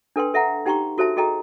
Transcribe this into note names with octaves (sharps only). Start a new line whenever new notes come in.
D4 A4 B4 G5 C6
A4 E5 F#5 A#5
D#4 G4 G5 A#5 C6 C#6
F#4 A4 C5 E5 A5
F#4 G#4 A4 D#5 G5 A#5